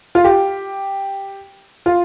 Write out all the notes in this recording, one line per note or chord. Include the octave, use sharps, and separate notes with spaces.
F4
G4
F4